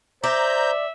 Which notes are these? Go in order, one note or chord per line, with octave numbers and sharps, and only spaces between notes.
C5 D5 E5 A#5 G6